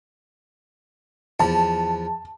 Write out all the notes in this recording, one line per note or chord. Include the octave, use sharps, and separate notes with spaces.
E2 F3 A5